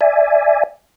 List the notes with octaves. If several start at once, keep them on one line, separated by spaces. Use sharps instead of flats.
D5 E5 G#5